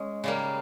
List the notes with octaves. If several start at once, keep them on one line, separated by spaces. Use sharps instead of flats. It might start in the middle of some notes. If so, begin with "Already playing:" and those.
Already playing: G#3 C#4
C#3 G3 A#3